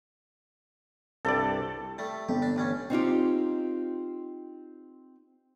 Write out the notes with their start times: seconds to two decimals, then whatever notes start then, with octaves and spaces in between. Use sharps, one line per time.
1.25 C2 G2 A4 D5
1.98 G3 A3
2.29 G1 G4
2.42 D4
2.56 A1 G3 C#4
2.90 C4 D#4 F4 G4